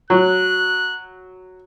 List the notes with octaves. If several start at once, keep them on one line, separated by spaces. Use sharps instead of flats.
F#3 F#6